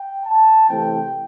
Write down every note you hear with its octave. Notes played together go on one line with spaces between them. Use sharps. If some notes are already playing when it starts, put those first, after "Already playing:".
Already playing: G5
A5
C3 E3 A3 C4 G5